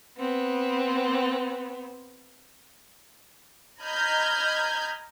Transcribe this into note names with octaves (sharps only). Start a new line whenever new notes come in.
B3 C4
D#5 A#5 B5 F6 G6 G#6